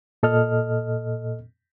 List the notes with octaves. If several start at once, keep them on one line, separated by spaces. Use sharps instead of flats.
A#2 A4 D#5 F6